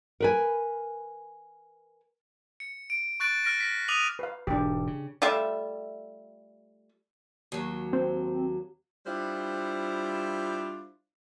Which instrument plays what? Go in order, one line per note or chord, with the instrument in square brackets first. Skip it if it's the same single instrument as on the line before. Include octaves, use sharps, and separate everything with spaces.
[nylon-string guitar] A#4 B4 G#5
[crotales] C#7
D7
C#6 F#6 A6 D7
F6 A#6 D7
A#6 B6
D6 D#6 F6 D#7 F7 F#7
[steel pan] B4 F5
[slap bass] E1 G#2 [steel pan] D4 G4
[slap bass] C#3
[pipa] G3 A3 F4 E5
[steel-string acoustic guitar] D#2 F#3
[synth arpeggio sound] C4
[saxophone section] G3 D4 E4 F4 C5